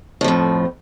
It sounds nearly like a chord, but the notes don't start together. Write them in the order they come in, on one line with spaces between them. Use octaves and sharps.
A2 F3 F2